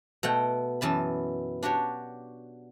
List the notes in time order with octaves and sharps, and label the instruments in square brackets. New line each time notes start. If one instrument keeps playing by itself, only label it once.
[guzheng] B2 A3 F#5 G5
F#2 E3 A5 B5
D4 F#4 G4 C#5